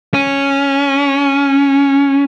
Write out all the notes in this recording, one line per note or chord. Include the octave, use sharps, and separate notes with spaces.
C#4